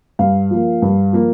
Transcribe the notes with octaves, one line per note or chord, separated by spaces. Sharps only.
G2 F5
F3 A#3
G2
F3 A#3